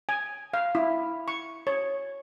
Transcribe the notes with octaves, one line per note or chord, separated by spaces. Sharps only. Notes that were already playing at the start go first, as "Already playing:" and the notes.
G#5
F5
E4
C#6
C#5